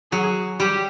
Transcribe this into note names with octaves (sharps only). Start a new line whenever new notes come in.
F#3 G#4
G3 G4